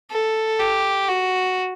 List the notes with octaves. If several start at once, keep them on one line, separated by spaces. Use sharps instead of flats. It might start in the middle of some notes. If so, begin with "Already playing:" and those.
A4
G4
F#4